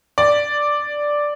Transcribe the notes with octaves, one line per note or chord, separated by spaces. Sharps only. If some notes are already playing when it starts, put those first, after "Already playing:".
D5